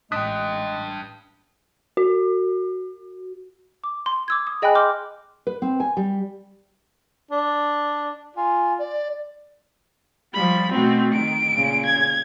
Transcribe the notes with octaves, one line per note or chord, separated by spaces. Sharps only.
A1 G#3 D4 G5 D#6 F#6 B6
F#4
D6
C6
D6 E6 G#6
D#6
G#4 D#5 G5 G#5 B5 F#6
C6 D6 F6 G6
B4
C4
G#5
G3
D4
F4 G#5
D5
F3 G3 B5
B2 A3 C4 F#4
D#3 D7
A#2 C#3
G#6